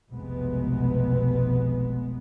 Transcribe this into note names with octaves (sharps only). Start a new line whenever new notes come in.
F1 B1 C3 G#3 B3